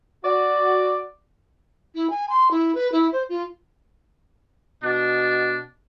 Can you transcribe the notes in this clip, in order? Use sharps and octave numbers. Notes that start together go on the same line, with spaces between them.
F#4 D5
E4
G#5
C6
E4
B4
E4
C5
F4
B2 D4